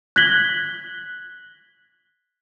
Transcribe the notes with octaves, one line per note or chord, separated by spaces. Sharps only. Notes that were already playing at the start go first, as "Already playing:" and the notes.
F#6 G#6 A#6 B6 F#7 G7